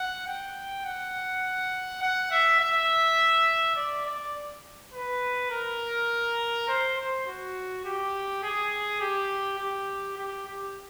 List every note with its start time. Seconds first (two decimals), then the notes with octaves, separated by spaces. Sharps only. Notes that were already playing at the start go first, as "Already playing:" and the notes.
Already playing: F#5
0.27 G5
0.85 F#5
2.02 F#5
2.31 E5
2.60 E5
3.76 D5
4.05 D5
4.93 B4
5.50 A#4
6.68 C5
6.97 C5
7.26 F#4
7.85 G4
8.43 G#4
9.00 G4
9.59 G4
10.17 G4
10.46 G4